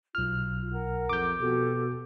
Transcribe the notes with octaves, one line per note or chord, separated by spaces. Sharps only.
B1 F4 F6
A#4 F#5
F2 D6 G6
B2 F#4 G4 A4